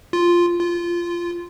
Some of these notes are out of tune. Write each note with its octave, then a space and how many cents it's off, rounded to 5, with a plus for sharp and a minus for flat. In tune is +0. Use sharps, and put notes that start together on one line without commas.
F4 -5
F4 -15